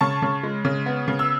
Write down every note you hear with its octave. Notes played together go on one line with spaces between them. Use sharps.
C#3 A5 C#6
C#3
G#3
C#3
B3
C#3
E6